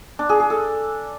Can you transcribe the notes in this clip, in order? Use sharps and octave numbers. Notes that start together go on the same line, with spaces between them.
D4
G#4
G#4
A4